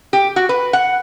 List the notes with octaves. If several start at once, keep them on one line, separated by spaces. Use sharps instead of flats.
G4
F#4
B4
F#5